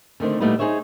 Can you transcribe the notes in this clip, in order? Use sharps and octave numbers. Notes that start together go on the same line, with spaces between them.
D3 D#3 A3 C4
A#2 G3 A3 B3 D#4 E4
D#4 E4 G#4 C5 C#5 E5